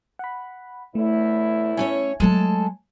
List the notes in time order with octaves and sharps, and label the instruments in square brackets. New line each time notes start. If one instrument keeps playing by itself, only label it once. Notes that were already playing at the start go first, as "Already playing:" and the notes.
[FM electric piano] F#5 B5
[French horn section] E2 A2 E4 [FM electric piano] A3
[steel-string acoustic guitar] A3 C#4 C#5 [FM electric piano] G#5
[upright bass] F#3 A3 [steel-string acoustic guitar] G#3 A4 A5